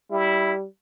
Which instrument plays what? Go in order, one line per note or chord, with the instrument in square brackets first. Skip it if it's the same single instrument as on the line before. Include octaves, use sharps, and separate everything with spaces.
[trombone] G3 [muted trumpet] E4